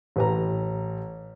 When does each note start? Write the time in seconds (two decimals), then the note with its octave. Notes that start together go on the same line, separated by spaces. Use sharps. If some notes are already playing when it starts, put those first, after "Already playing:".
0.16 A1 B4 A#5